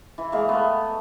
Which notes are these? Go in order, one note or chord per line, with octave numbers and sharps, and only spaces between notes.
E3
G#3 A#3
A3 B3